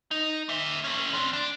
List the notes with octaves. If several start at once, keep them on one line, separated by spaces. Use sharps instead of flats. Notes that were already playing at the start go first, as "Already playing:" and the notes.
D#4
A#3 E5
A3 C#4
C4 D4
D4